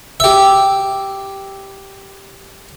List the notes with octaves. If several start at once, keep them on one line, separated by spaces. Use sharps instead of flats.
G4 E5